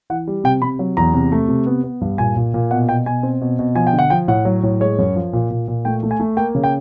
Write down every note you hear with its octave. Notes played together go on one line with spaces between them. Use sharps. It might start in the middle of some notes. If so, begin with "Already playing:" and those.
E3 F#5
G3
C3 G5
C3 B5
F#3
E2 A#5
C3
A3
C3
B3
B3
G2
A#2 G#5
A#2
A#2
B2 F#5
B2 G5
B2 G#5
C4
B2
B2
F3 G#5
G5
D3
F#5
F3 G5
A2 F#5
F#3
A2
G#3 C#5
F#2
F3
A#2
A#2
A#2
A3 G5
A3
G#5
A3
A#3 G5
C#3
G5